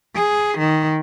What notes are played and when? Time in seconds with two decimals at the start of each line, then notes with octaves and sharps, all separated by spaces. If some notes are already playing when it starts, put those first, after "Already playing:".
0.15 G#4
0.59 D#3